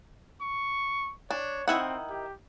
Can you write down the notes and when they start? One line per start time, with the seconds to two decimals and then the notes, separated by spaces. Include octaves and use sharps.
0.41 C#6
1.30 D4 C#5
1.68 D#3 C4 E4 F#5
2.10 G4